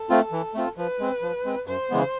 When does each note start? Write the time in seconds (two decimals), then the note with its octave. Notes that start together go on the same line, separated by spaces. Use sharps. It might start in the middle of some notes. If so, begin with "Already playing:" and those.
Already playing: A4
0.10 A3 C4 F4
0.32 E3
0.54 A3 C4 F4
0.77 F3 B4
0.99 G#3 C4
1.22 F3
1.45 G#3 C4
1.67 F#2 C5
1.90 C#3 E3 G#3 B3